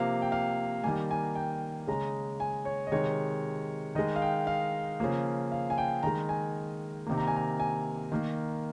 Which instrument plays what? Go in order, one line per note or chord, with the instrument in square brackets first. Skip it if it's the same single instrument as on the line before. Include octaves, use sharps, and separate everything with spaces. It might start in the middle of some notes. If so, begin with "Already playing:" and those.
Already playing: [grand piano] C3 F3 A#3 F5
G5
F5
D#3 G3 A#3 G#5
G#5
G5
C#3 G#3 A#5
G#5
C#5
D#5
C3 D#3 G#3 C#5
D#3 D#5
G#3
F5
G5
F5
C#3 F3 A#3
F5
G#5
G5
D#3 G#3 A#5
G#5
C3 D#3 A#3
A#5
G#5
A#5
G#5
D#3 A#3